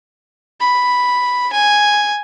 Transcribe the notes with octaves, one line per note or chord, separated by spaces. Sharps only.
B5
G#5